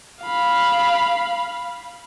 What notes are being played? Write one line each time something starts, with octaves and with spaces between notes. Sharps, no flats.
F5 B5